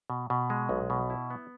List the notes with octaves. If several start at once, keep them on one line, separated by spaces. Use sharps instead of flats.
B2
B2
G#3
B1
B2
E4
B3